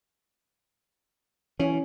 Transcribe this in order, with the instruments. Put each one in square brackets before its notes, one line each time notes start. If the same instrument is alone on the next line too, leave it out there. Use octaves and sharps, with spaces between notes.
[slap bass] E3 [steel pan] C#4